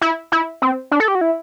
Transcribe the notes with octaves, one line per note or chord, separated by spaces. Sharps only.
E4
E4
C4
D4
A4
G4
F#4
E4